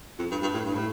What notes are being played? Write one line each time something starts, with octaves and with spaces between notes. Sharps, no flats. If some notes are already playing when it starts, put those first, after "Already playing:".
F2
G2
G2
A2
G2
A2